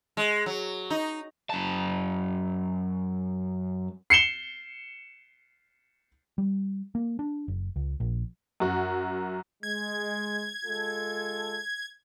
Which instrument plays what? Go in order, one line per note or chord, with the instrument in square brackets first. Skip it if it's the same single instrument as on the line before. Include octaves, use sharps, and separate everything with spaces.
[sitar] G#3
F#3
D#4
[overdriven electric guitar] F#2 A5
[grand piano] C7 C#7 E7 G7
[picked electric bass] G3
A#3
D4
F#1
C#2
A#1
[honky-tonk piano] F#2 F#4
[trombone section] G#3 [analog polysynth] G#6
[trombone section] G#3 F4 A4